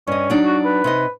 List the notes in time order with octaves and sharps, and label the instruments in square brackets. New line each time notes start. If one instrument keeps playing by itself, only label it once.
[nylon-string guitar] G2 D#5 [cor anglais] C#4
[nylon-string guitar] F#3 D4 D#4
[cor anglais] F#4
B4
[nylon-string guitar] C3 D#4 D#5